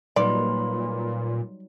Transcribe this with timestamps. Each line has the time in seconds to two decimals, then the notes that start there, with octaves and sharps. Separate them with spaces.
0.16 A#2 F#3 G3 D#4 B4 D5 B5 C6